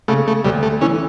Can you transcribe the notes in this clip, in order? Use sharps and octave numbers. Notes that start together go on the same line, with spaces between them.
C#3 A3
A3
D2 G3
A3
E3 C#4